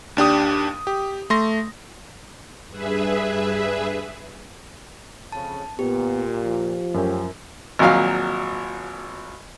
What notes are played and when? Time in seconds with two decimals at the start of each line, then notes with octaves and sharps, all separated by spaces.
0.17 D#2 D4 G4 D#6
0.87 G4
1.30 A3 C6 A#6
2.70 G2 G#4 B4 E5
5.32 F2 C#3 A5
5.79 A#2 B3 G4
6.43 F3
6.94 F#2 A3 C#4 G4
7.79 G#1 A#2 F3 F#3 F5 F6